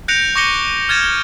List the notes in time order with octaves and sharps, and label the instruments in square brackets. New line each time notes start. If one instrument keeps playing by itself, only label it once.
[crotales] F#6 G6 A#6 C#7 D7 F7
C#6 D6 A#6 C#7 G7
F6 G#6 A6 E7